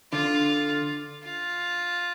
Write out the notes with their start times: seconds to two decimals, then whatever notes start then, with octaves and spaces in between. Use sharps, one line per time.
0.12 D3 F4
1.24 F4